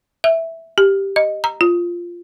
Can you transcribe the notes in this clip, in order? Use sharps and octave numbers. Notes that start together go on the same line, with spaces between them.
E5
G4
D#5
A#5
F4